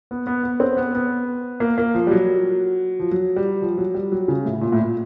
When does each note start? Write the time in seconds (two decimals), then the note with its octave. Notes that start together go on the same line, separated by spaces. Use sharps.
0.11 B3
0.27 B3
0.43 B3
0.60 C4
0.77 B3
0.95 B3
1.60 A#3
1.78 A#3
1.94 F3
2.07 G3
2.11 F#3
2.99 F3
3.12 F#3
3.36 G3
3.62 F3
3.78 F#3
3.94 G3
4.12 F#3
4.28 C#3
4.45 A2
4.61 A#2
4.72 A2
4.79 A#2